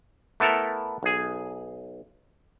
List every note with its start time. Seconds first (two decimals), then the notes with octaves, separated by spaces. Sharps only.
0.40 A3 B3 E4 A4 A#4
1.03 B1 G#4